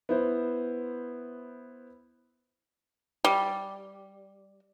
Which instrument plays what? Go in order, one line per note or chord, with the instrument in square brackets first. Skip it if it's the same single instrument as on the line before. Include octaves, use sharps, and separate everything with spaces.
[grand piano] B3 E4 C5
[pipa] G3